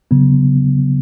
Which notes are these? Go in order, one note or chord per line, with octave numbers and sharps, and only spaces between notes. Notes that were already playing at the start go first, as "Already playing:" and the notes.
C#3 F#3 B3